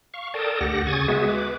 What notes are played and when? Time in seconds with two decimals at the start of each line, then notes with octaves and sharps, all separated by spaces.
0.14 F5 C#6
0.34 A4 A#4 D5 G5 A5 D#6
0.61 D2 G4 F#5 A#6
0.87 C#3 G#5 C#6 D#6 G#6 A6
1.08 G#3 B3 F#4 G#4 E5
1.28 B4 D6